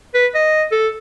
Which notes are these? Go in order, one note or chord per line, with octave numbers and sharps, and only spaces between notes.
B4
D#5
A4